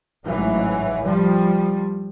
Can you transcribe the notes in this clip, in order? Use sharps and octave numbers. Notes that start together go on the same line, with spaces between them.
A1 G#2 E3 F#3
F3 G3